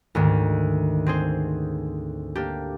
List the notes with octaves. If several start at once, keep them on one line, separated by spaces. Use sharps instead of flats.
D2 G#2 D#3
C4 G#4 C5
A#3 D4 G4